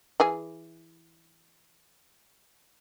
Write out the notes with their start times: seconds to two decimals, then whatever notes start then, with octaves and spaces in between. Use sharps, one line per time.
0.20 E3 G#4 G#5